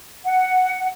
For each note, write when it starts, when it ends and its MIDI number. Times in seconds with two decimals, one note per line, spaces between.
0.24 0.88 78